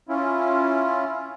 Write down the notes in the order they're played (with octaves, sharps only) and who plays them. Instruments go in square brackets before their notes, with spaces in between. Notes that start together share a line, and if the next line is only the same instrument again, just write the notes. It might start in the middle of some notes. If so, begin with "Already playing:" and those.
[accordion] C#4 E4 F4